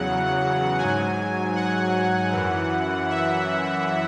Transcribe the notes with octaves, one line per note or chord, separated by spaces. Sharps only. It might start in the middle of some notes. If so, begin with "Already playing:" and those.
Already playing: E2 C#3 F#3 F#5
G#2 F#3 G#5
F#5
F#2 E3
E5